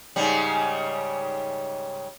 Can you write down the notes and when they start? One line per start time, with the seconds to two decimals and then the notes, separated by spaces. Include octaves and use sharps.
0.16 G#2 C#3 G3